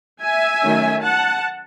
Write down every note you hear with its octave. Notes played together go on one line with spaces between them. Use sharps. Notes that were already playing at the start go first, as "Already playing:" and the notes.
E5 G#5
D#3 F#3 A3 C#4
F#5 A5